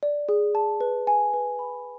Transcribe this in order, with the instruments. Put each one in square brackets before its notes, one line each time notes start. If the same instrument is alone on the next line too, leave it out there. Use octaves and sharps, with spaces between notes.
[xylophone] D5
G#4
A5
B4
G#5
B4
B5